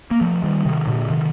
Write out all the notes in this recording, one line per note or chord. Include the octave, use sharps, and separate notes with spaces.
A#3
F3 A3
D#3 G3
C3 D#3
A#2 D3
C3 D#3